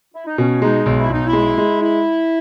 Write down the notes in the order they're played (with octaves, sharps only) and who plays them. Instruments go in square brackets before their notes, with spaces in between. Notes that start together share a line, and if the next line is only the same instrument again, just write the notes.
[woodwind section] E4
D#4
[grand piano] B2 [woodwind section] C#4
[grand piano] G#3 [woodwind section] D#4
[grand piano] B1
[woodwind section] E4
[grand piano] B1 [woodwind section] D#4
[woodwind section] E4
[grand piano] G#3
G#3
[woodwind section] E4